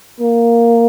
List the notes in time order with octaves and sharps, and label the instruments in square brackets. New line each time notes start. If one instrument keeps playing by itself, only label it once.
[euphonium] A#3